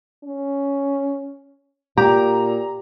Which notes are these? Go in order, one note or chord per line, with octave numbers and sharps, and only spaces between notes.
C#4
A#2 G4 A#5